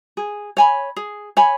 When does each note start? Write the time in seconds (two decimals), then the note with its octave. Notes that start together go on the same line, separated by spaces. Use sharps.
0.17 G#4
0.57 C#5 G#5 B5
0.96 G#4
1.37 C#5 G#5 B5